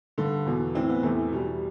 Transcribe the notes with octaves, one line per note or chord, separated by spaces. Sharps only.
G2 D3 A4
E2 B2
A2 E3 C4
B3
E2 C3 E3 A3
E2 B2 G3
G3